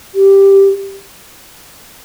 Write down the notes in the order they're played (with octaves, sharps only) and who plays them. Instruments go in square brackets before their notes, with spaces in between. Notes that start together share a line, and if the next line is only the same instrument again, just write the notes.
[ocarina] G4